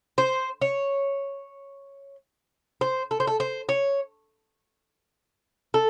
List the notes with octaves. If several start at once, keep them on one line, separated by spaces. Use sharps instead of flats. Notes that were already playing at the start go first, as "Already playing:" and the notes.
C5
C#5
C5
A4
C5
A4
C5
C#5
A4